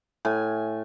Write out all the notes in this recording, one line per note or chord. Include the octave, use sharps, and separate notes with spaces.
A2 G#5